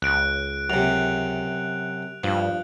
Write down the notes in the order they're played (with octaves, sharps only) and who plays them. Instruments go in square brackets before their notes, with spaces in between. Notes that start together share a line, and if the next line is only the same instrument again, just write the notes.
[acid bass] C#2 [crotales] F#6 D7
[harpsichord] F#2 C3 [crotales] F7
[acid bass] G2 [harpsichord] F3